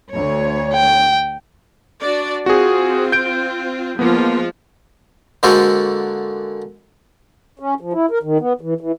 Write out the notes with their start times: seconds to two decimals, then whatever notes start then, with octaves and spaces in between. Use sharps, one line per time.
0.12 D2 C#5
0.73 G5
2.01 D4 F#4 D5
2.46 C4 F4 F#4 G#4
3.12 G6 D7
3.99 F3 G#3 A#3 B3 F4
5.43 D3 G#3 A#3 F#4 A4 C5
7.59 C#4
7.80 F3
7.93 E4
8.11 A#4
8.23 D#3
8.40 B3
8.61 E3
8.81 E3